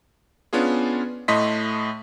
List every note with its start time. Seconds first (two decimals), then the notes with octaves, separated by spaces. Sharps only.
0.53 B3 C#4 D4 F4 G#4
1.28 A2 A3 D#5 C6 B6